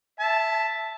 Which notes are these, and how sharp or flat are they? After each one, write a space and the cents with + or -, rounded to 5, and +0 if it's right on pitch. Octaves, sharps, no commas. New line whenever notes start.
E5 +0 A5 +0